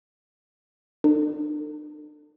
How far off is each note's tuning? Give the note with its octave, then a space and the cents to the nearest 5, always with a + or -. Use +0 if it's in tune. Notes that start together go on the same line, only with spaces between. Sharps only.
D4 +45 A4 +40